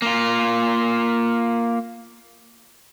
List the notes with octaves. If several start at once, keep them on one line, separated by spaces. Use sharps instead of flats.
A#3 F4